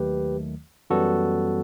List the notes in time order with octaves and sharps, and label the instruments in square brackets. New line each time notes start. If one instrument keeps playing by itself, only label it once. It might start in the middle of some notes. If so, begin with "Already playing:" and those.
Already playing: [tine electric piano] D#2 D#3 F#3 A3 G4 B4
F#2 E3 G3 B3 F#4 A4